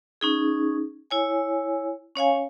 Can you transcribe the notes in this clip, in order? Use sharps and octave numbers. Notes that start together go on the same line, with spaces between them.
C#4 D#4 G#4
E4 C#5 G#5
C#4 C#5 F5 G#5